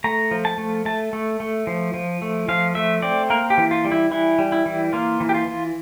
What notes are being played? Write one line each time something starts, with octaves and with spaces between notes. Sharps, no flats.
A3 A#5
F3
A5
A3
A3 A5
A3
A3
F3
F3
A3
F3 F5
A3 E5
C4 D5
A#3 A#4
G4
E3
F4
G3
E4
E3 E4
G3
E4
E3
A#3 F4
E3
G4
F4
E3